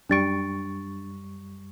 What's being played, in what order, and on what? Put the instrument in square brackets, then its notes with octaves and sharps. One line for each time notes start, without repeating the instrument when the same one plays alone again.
[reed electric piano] F#2 G3 C#6 [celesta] D4 A6 D7